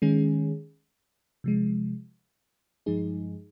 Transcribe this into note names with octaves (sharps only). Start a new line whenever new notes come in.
D#3 G#3 C#4 G#4
C3 F3 G#3
G2 F3 G#3 D#4 G#4